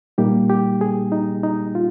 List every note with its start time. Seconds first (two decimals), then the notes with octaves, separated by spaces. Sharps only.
0.18 A#2 G3 A#3 D#4 G4
0.50 G4
0.81 G#4
1.12 D#4
1.43 D#4
1.75 F4